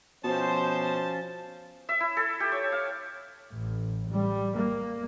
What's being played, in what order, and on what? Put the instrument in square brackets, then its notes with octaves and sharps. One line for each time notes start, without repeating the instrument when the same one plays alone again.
[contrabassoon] B2 [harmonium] F3 C#4 [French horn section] C5 [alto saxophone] A5
[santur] E5
E4
A4
G4
C#5
F5
[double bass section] A1
G3
A#3